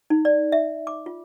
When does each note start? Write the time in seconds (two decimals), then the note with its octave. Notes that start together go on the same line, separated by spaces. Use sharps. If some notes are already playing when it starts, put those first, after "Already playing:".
0.10 D#4
0.25 D5
0.52 E5
0.87 D6
1.06 F4